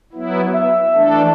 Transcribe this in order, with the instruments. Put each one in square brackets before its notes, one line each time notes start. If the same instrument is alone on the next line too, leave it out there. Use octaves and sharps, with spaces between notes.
[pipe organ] F#3 B3 E4
[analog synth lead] E5
[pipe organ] E3 A3 D4 A4